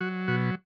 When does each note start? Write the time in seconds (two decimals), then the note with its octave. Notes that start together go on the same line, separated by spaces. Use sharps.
0.01 F#3 F#4
0.28 B2 F#4